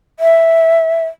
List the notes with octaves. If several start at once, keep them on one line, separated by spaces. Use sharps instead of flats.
E5